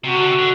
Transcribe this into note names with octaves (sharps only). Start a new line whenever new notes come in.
C3 F#4
D3
C3
D3